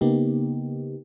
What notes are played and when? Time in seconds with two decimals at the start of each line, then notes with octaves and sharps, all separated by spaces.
0.01 C#3 A#3 B3 D#4 G4